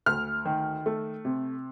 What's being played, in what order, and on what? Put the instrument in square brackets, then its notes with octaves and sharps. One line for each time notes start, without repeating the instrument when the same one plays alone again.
[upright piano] D2 F6
D#3
A3
C3